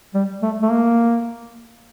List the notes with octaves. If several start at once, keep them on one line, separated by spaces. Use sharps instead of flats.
G3
A3
A3
A#3